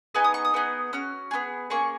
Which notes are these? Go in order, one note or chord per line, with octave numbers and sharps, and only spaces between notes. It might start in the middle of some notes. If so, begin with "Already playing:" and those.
B3 D#4 G#4 G#5
D#6
C#6
D#6
B3 D#4 G#4
C#4 F#4 F6
B3 F4 G#4
A#3 C#4 G#4 C#6